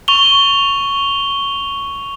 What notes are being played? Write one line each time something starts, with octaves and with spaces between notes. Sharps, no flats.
C#6 F7 G7